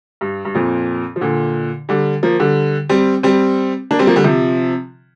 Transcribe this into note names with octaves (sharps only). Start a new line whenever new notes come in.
G2
G2
F2 A#2
F3
A#2 D3
D3 G3
F3 A#3
D3 G3
G3 C4
G3 C4
A#3 D4
G3 C4
F3 A#3
D3 G3
C3 F3